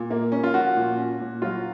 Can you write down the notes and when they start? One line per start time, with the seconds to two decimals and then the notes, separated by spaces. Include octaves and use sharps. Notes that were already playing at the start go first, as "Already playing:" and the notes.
Already playing: A#2
0.11 A#3
0.32 C#4
0.44 F4
0.54 F3 F#4
0.76 A#2
0.98 C#4
1.20 A#2
1.42 F#3 F4